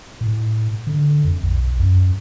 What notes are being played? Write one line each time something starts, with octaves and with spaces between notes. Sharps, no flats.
A2
D3
F2
B1
F#2